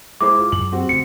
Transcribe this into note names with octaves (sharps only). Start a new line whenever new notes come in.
G#3 E4 C5 D6
F4
F#2 F#7
C4 F#4 G4
C#3 A3 C#7